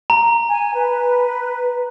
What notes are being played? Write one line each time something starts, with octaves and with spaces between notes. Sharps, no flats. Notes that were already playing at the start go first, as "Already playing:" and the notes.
A#5
G#5
B4